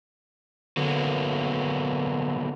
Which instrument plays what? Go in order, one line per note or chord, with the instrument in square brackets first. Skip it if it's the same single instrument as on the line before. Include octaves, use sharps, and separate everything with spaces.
[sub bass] D3 [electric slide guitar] F#3 A#3 B3